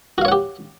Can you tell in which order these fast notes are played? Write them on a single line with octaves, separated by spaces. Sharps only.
F#4 F5 C#5 F#5 G4